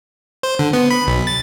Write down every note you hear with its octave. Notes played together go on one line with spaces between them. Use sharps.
C5
D3
B3
B5
B1
A6